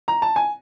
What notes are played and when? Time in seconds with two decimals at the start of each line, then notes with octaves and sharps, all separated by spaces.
0.08 A#5
0.22 A5
0.36 G#5